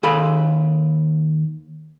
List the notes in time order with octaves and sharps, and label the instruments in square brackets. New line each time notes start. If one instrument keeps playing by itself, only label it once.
[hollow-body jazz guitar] D#2 G#4 A4 F5 B5